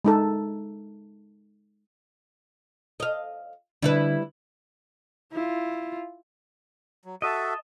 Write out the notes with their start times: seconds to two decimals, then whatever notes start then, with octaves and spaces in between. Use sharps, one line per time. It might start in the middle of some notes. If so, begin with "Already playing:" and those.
0.04 G#3 D#4 A4
3.00 D#5 F5
3.82 D3 G3 E4 B4
5.32 E4 F4
7.05 F#3
7.22 F#4 A4 D#5 E5 A5